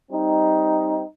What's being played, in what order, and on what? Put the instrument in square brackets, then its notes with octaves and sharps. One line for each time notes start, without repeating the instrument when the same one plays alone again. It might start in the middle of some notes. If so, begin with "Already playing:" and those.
[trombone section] G3 C4 D#4